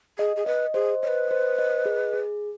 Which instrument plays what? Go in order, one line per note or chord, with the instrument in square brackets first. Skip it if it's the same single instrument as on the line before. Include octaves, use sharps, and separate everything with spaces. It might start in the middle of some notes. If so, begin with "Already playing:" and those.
[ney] G#4 [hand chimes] D#5
[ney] G#4
[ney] B4 [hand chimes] D#5
[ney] G#4 [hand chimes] C5
[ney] B4 C#5 [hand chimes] D#5
[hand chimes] C5
D#5
G#4
G#4